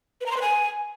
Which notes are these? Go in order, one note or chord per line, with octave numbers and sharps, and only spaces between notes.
B4
A#5
C6
B4
G#5